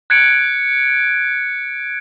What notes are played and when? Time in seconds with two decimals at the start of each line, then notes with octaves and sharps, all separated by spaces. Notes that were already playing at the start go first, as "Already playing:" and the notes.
0.10 F#6 G#6 C#7 D7